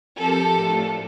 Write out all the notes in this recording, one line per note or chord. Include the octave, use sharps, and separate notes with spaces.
F3 C4 G4 A4 A#4
A2 A3 D4 F4